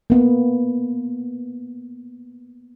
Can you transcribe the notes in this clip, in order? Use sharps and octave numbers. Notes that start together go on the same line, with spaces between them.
A#3 B3